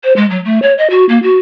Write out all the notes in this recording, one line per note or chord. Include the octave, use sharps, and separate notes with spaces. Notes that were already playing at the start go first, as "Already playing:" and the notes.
C5
G#3
F#3
A3
C#5
D#5
F#4
A#3
F#4